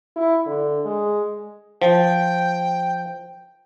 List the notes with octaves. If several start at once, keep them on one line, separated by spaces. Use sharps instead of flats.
E4
D3
G#3
F3 G5